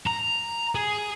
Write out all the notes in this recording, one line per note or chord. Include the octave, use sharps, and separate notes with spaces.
A#5
G#4